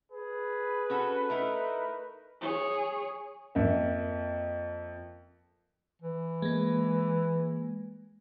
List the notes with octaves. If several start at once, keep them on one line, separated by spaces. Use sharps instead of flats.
G#4 B4
C#4 F#4 A4
A3 D#4 E4 A#4
G#4 C#5
F2 A#3 E5
E3
G#3 A#3